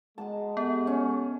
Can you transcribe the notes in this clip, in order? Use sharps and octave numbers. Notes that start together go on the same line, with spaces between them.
G#3 D#5 F#5 A5 A#5
B3 G4 A4 F#5
C#4